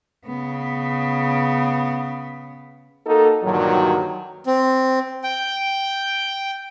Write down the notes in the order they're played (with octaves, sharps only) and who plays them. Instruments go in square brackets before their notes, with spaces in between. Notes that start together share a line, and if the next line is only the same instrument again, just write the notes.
[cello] C#3 B3
[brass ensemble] A#3 D#4 F#4 A4
G2 A#2 D3 D#3 F#3
[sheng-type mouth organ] C4
G5